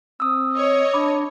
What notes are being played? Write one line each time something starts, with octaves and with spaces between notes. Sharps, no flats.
C4 D#6 E6
C#5 D#5
D4 B5 D6